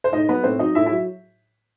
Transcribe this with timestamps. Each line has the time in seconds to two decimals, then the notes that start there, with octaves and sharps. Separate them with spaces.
0.04 C5
0.12 A2 D#4 D#5
0.29 F#3 B3 B4
0.44 A2 C4 C5
0.59 F#3 D#4 D#5
0.75 A2 E4 E5
0.86 E4 E5
0.91 F#3